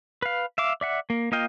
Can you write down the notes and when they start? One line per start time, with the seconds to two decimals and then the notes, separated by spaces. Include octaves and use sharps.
0.22 B4 F5
0.58 E5 F5 D6
0.81 D5 E5 F#5
1.10 A#3
1.32 A#3 F4 D#5 F5 G5